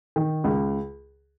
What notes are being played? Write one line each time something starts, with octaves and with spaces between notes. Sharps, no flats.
D#3
C#2